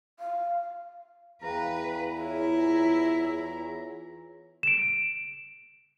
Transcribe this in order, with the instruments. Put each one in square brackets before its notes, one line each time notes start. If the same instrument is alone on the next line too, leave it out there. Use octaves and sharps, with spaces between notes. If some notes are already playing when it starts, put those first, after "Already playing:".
[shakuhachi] F5
[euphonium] E2 [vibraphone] G#4 F5 G5 [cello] B4 [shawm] A#5
[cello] E4 [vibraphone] F4 G#4 C#5
[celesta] D7 E7